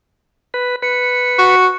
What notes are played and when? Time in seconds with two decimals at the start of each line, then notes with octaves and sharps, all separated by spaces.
0.54 B4
0.82 B4 C#7
1.38 F#4